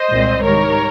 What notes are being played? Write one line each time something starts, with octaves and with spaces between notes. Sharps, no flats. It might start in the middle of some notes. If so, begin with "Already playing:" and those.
Already playing: C5 D#5
C2 A#2 G#3 C4
G#2 D#3 G3 A#4 C#5